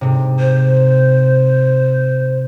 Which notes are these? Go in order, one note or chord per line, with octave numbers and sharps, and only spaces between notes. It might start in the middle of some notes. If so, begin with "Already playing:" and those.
G#2 C3
C5